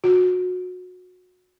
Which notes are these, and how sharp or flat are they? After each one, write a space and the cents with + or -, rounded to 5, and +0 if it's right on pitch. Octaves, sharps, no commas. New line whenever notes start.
F#4 -25